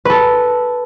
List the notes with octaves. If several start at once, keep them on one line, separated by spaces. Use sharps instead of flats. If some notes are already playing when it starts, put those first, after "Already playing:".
A4 B4